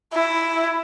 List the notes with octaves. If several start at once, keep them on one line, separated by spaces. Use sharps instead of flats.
E4